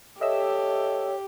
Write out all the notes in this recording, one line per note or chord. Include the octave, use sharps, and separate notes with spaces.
G4 A4 C#5 D#5 E5 E6